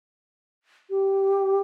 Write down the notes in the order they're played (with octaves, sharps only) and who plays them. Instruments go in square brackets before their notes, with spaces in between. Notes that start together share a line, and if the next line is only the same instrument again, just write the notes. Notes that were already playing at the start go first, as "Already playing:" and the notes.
[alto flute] G4